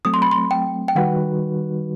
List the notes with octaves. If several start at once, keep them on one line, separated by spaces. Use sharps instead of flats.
F#3 A3 C4 D#6
C6
B5
C6
G5
G5
D#3 G3 D#4 F#4 B4 F#5